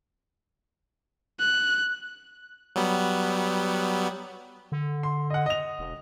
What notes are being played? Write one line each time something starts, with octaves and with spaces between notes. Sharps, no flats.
F#6
F#3 G3 B3
D3
C6
D#5 F#5
D#5 F7
E1